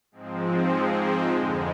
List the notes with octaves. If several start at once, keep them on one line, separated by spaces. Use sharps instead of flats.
G#2 F3 G#3 C4
F2 D3 G#3